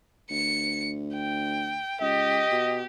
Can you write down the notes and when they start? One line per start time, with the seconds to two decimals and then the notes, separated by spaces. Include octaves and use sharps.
0.31 D2 C#7
1.14 G5
2.01 C#2 G4 D#5
2.52 B2